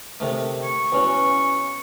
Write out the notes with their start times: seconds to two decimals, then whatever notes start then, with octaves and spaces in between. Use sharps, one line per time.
0.20 C3 D#3 A3
0.63 C#6
0.92 E2 C#4 F#4